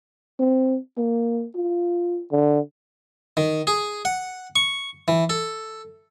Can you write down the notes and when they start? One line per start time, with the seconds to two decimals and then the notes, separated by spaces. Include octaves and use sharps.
0.39 C4
0.97 A#3
1.55 F4
2.32 D3
3.37 D#3
3.67 G#4
4.05 F#5
4.56 C#6
5.08 E3
5.30 A4